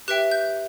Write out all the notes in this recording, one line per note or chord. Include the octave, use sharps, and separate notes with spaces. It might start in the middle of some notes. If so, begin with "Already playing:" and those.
G4 B4 E5 G5 F#6
G6